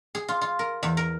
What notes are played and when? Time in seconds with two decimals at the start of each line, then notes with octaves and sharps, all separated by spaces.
0.15 G#4
0.28 F4
0.41 F4
0.59 A#4
0.83 E2
0.97 A#4